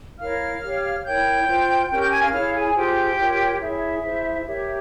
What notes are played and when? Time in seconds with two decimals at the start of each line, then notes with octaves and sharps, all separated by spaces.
0.19 E4 A#4 C#5 F5 F6
0.63 G4 C#5
1.05 E4 A#4 C#5 G5 G6
1.48 F4 C5
1.90 C#4 G4 A#4 G5 G6
1.97 F6
2.00 G5 G6
2.11 G#5 G#6
2.22 F5 F6
2.32 E4 G#4 C#5 F5 F6
2.54 G#4 G#5
2.76 F4 G4 G#4 C5 G5
3.18 F4 A#4 C#5
3.61 E4 G#4 C#5 E5
4.04 E4 G#4 C5
4.46 G4 A#4 C#5 E5